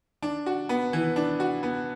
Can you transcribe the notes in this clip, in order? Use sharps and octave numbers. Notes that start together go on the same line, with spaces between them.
D4
F#4
B3
E3
D4
F#4
B3